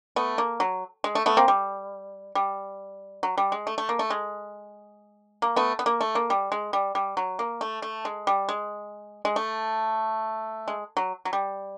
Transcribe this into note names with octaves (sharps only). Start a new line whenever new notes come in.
A3 B3
A#3
F#3
G#3
A3
A3 B3
A#3 C4
G3
G3
F#3
G3
G#3
A3
A3
A#3
A3
G#3
A#3
A3 B3
B3
A#3
A3
A#3
G3
G#3
G3
G3
F#3
A#3
A3
A3
G#3
G3
G#3
G#3
A3
G#3
F#3
F#3
G3